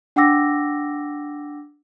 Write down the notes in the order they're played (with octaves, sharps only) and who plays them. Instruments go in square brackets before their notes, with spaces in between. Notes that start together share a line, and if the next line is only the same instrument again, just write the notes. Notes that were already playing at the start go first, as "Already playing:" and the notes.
[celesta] D4 F#5 G5 D6 E6 A#6